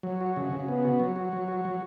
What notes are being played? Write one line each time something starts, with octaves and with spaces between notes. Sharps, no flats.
F#3
F#4
C#3
C#3
B3
F#4
F#3
F#4
F#3
F#4
F#3